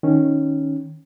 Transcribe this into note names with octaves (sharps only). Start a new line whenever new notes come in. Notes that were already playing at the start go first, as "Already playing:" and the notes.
D#3 C#4